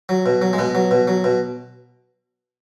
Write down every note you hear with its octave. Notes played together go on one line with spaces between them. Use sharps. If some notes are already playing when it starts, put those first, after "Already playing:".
F#3
B2
F#3
G#3
B2 B3
F#3
B2
F#3
B2